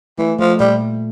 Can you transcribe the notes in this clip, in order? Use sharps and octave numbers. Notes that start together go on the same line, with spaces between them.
E3 A3
F3 A3
A#2 G3